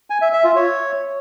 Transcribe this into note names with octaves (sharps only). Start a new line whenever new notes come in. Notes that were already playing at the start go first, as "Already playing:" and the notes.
G#5
E5
E5
F4
C#5